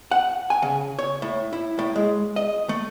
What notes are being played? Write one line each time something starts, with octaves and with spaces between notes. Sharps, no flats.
F#5
G#5
C#3
C#5
A2
E4
A2
G#3
D#5
A3